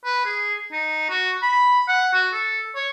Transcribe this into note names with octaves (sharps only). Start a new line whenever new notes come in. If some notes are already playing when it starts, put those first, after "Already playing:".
B4
G#4
D#4
F#4
B5
F#5
F#4
A4
C#5